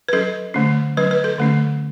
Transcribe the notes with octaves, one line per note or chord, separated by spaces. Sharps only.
B4
F#3 C#4 A4
D3 A3 C#4
F#3 C#4 B4
B4
A4
D3 A3 C#4